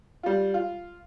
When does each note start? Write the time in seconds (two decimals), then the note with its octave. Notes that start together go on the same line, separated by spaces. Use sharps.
0.23 G3 F4
0.54 F4